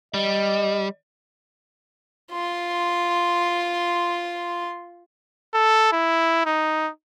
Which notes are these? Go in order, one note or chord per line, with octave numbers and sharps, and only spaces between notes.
G3 D#5
F4 C6
A4
E4
D#4